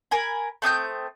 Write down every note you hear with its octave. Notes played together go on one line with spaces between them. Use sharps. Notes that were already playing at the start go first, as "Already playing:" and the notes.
A#4 G#5 B5
A3 C4 D#6 G6